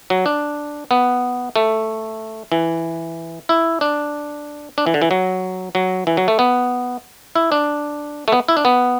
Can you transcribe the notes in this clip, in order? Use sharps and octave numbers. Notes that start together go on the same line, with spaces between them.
F#3
D4
B3
A3
E3
E4
D4
D4
E3
D3
E3
F#3
F#3
E3
F#3
A3
B3
E4
D4
A3
B3
E4
D4
B3